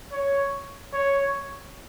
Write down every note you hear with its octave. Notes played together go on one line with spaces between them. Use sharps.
C#5
C#5